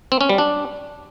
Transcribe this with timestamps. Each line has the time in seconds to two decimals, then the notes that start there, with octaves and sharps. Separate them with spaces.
0.12 C4
0.21 C#4
0.29 G3
0.38 D4